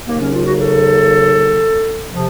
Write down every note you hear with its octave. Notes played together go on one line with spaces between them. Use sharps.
D#2 C#3 F#3 A#3
C#4
F4
F#4
A4
C3 F3